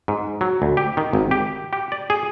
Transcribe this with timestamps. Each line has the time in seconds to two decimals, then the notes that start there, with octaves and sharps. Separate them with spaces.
0.08 G#2
0.41 F#3
0.62 D2
0.77 G4
0.97 D#3
1.13 G#1
1.31 G4
1.73 G4
1.92 D5
2.10 G#4